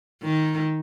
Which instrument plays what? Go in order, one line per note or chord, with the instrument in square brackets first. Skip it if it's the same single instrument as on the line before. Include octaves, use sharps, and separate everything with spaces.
[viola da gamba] D#3